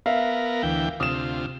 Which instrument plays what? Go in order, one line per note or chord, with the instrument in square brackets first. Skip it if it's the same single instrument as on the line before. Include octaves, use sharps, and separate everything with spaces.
[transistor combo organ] B3 A#4 [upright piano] E5 F5
[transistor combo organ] D2 E3 G5
[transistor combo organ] D2 C3 F4 [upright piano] D#6 E7